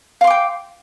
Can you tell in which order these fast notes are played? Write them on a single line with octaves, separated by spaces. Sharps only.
F5 C6 D6 G5